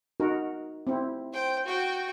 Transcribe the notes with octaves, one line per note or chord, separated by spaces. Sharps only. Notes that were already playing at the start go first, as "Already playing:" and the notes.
D#4 F#4 A#4
C4 E4
C5 G5
F#4 G5